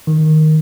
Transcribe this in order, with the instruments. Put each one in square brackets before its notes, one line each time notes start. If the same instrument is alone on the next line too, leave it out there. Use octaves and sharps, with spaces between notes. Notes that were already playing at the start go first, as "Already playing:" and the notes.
[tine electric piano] D#3